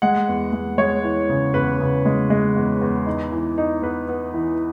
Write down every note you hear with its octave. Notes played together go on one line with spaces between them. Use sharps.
G#3 F#5
E2
G#3
G#3 C#5
E3
C#3
E2 B4
C#3
G#3
G#3
E2
E2
D#4
E3
D#4
B3 B4
B3
E3